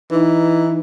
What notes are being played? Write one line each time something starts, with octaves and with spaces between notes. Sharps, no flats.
E3 D#4